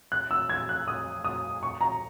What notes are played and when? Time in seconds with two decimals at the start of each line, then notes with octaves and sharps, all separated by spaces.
0.12 F#6
0.31 E6
0.49 G#6
0.69 F#6
0.88 D#6
1.24 D#6
1.63 C#6
1.81 A#5